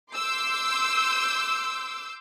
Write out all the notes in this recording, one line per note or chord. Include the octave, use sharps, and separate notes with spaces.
C6 D6 E6 G6